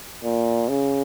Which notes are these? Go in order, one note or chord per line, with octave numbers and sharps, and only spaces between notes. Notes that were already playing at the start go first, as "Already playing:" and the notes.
A#2
C#3